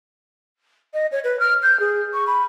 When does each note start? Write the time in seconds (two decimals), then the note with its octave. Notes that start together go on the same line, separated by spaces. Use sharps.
0.94 D#5
1.12 C#5
1.24 B4
1.39 F6
1.63 G6
1.80 G#4
2.13 C#6
2.27 B5